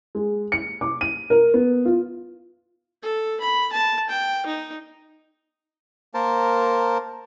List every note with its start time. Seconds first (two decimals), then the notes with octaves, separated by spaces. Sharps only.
0.15 G#3
0.52 C#7
0.81 D6
1.01 D#7
1.30 A#4
1.54 B3
1.85 F4
3.02 A4
3.40 B5
3.73 A5
4.10 G5
4.46 D#4
6.14 A#3 A#4 C5 A5